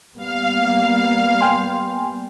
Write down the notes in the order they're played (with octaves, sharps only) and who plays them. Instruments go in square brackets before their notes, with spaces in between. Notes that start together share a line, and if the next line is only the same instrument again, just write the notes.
[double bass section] G3 A#3 B3 [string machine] F5
[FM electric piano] G5 G#5 C6